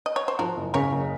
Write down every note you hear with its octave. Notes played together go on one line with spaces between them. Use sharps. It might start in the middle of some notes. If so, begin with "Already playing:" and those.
D#5
C#5
C5
F3 F#4 A#4
F#1
C#3 A#4 C#5
F#1